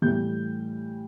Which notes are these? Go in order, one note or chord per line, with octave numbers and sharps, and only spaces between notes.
A2 E3 G3 G6